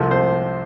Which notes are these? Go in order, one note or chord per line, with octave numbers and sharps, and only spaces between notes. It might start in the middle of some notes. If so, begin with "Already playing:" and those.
Already playing: C2 C3 F3 A3 C4
C5